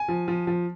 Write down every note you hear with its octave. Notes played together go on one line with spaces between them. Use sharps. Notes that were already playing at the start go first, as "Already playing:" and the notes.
Already playing: G#5
F3
F3
F3